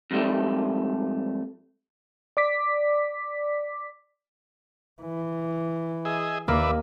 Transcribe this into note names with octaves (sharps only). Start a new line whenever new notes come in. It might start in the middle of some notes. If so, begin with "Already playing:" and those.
F2 G#2 G3 A3
D5 D6 B6
E3
G#4 D#5 E5
D#2 A#3 B4 D5 E5